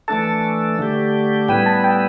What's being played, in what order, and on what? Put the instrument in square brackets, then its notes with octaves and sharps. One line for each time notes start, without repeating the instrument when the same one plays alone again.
[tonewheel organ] E3 A3 D4 A4 [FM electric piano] A5
[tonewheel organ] D3 A3 G4
[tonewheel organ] A2 G3 B3 E4 B4 [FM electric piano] G5
[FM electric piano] A5
G5